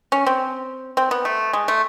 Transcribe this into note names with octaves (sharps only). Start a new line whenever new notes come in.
C#4
C4
C4
B3
A3
G#3
A3